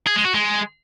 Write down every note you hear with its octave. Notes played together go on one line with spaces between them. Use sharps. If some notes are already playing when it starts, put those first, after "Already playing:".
G#4
G#3
F#4
G#3